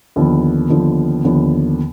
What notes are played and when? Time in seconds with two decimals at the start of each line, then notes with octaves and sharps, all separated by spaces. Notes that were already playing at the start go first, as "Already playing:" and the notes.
0.16 D#2 D3 F3 B3
0.70 D#2 D3 F3 B3
1.24 D#2 D3 F3 B3